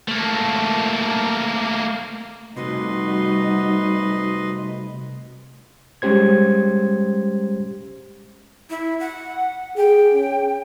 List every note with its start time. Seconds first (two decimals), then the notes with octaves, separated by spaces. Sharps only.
0.08 A3 A#3
2.56 C3 G3 A3 D#4 F#4 B4 D#5 C6
6.02 G3 G#3 C#4 G4 C5 G#6
8.70 E4
9.00 F#5
9.77 G#4 G5
10.14 C#4